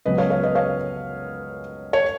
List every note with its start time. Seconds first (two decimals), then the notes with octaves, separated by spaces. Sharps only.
0.05 C#2 C#3 F#3 B3 B4 D#5
0.18 C#5 F5
0.30 C#5 F5
0.43 B4 D#5
0.55 C#5 F5
1.93 C#5